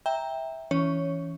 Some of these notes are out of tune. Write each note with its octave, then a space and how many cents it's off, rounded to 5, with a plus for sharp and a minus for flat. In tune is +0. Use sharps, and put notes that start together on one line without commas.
E5 -10 G5 +10 A#5 +0
E3 +0 C#4 +15 C#5 +0